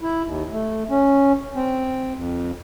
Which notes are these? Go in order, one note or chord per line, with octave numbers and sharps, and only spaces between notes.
E4
D#2
A3
C#4
C4
F2